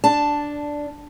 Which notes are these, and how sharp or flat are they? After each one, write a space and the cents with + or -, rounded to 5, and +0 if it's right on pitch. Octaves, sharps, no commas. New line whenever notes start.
D4 +0 A5 +0